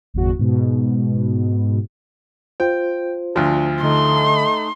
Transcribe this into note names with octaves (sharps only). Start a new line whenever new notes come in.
G1 E2 F#4
G#2 B2
F4 C5 G5
D2 F3 D4
D3 A3 D#4 C6